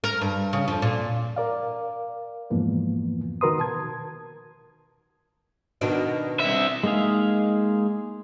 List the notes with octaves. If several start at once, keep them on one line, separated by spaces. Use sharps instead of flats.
A#4
G2
C#3
F2
A#2
A#4 D5 F5
F2 G#2 E3 F3 A#3 B3
D#3 F#4 A#4 B4 C6 D#6
B2 A5 G#6
B2 D#3 D4
C2 E5
G#3 A#3 D#4 G#4 F5